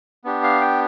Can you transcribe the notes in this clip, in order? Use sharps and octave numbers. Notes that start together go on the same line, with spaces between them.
B3 D4 G4
F5
G5